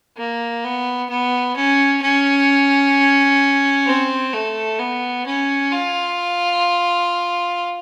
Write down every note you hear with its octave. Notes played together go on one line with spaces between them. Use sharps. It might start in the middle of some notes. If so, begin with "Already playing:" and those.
A#3
B3
B3
C#4
C#4
C4
A3
B3
C#4
F4